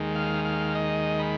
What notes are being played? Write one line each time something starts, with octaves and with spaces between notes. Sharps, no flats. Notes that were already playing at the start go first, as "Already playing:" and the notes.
Already playing: D#2 D#3 G#3
F5
F5
D#5
B5